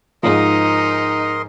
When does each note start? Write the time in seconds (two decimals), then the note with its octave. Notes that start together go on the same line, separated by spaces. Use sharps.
0.23 G#2 F3 D#4 A#4 D#5 C6